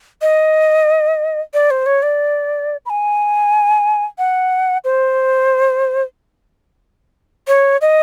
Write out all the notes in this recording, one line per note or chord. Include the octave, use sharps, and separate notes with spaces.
D#5
D5
C5
C#5
D5
B5
G#5
F#5
C5
C#5
D#5